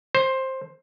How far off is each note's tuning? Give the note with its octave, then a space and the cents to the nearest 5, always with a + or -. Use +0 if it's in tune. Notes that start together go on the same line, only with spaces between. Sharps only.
C5 +10